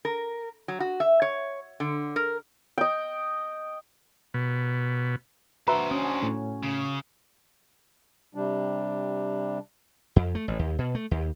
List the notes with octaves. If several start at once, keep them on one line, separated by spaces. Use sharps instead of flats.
A#4
F#3
F#4
E5
C#5
D3
A#4
D#5 G5
B2
D4 F#4 B4 C5 E5 A#5
C#4 D#6
A2
C#3
C3 G3 D4
F2
A3
A1
D#2
B2
A3
D#2